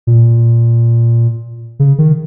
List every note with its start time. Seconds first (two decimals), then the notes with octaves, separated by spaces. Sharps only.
0.07 A#2
1.79 C#3
1.98 D#3